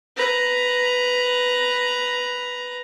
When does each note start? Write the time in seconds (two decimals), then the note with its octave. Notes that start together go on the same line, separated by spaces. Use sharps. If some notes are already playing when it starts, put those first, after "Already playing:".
0.16 B4 A#5